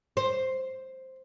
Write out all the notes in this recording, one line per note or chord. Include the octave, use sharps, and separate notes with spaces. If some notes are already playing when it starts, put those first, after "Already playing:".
C5